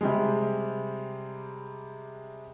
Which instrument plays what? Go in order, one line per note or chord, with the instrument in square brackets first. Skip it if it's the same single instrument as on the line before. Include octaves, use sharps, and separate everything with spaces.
[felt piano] C3 G3 G#3